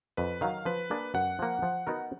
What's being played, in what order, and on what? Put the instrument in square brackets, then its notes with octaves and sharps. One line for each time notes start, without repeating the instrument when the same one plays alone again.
[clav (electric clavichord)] F2 [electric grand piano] B4
[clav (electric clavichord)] D#3 F#3 [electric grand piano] F5
[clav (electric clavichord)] F3 [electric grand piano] B4
[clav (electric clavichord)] A#3 D4 G#4
[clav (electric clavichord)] F#2 [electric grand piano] F#5
[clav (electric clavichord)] F3 A#3
F3
B3 D#4 F#4 A#4